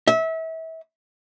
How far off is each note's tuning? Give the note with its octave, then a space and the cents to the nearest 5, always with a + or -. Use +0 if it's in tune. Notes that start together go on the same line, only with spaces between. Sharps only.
E5 -30